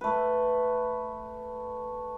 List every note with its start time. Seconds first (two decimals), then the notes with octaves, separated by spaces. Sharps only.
0.01 A3 B4